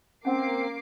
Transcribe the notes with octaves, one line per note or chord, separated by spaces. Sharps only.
A#3 C4 C#4 F#5 D6 C7